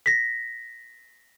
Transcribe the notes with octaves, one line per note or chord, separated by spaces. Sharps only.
A#6 B6